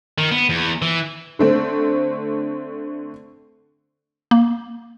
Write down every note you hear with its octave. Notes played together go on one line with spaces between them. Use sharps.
D#3
B3
E2
E3
D3 A3 C4
A#3